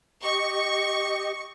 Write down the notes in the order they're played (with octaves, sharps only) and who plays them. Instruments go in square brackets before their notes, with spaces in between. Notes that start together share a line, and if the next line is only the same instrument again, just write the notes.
[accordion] G4 D#5 [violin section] C#6